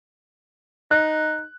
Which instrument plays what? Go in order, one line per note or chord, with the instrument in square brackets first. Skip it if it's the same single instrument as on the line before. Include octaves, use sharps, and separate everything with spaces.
[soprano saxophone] D#4 [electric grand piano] F#6